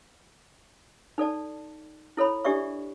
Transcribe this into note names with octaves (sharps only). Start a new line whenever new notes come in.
D#4 A4 D5 A5
E4 A4 C#5 B5
D4 G4 A4 D5 E5 C#6